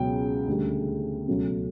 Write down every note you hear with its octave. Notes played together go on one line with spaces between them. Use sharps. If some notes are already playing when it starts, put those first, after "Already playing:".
Already playing: C#2 B2 F#3 G5
D2 C#3 G3
C#2 B2 F#3 A3